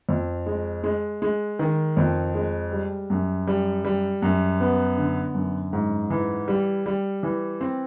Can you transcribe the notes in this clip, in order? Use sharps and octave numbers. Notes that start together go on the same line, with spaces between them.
F2
G#3
G#3
G#3
D#3
F2
G#3
G3
F#2
G3
G3
F#2
B3
D3
F#2
G#2
E3
G3
G3
E3
C4